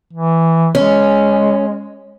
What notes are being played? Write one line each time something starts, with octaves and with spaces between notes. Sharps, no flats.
E3
G#3 C#4